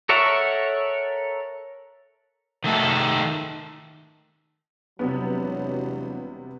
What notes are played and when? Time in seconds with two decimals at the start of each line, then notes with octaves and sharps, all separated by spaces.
0.09 A4 A#4 C#5 E5 F#5
2.64 D#3 A3 A4
4.99 E1 C3 F#3 G3 B3